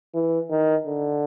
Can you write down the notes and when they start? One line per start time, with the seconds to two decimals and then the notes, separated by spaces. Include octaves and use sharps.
0.14 E3
0.50 D#3
0.86 D3